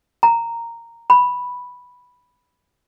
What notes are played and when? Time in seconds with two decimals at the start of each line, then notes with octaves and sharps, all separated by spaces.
0.23 A#5
1.10 B5